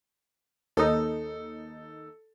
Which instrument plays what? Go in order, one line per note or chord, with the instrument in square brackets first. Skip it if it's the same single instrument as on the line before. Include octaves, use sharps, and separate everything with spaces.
[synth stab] D#2 D#4 [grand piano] A4